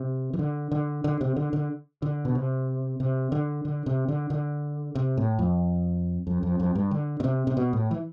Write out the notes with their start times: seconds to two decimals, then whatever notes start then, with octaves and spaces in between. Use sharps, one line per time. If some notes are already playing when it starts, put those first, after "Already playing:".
Already playing: C3
0.33 E3
0.39 D3
0.72 D3
1.04 D3
1.21 C3
1.36 D3
1.53 D3
2.02 D3
2.25 B2
2.35 C3
3.00 C3
3.32 D3
3.65 D3
3.86 C3
4.08 D3
4.30 D3
4.95 C3
5.17 A2
5.39 F2
6.27 F2
6.43 F2
6.60 F2
6.75 G2
6.91 D3
7.20 B2
7.24 C3
7.47 C3
7.57 B2
7.73 A2
7.91 E3